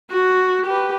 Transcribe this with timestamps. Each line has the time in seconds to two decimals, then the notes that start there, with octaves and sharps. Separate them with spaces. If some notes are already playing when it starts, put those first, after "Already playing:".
0.11 F#4
0.66 G4 B4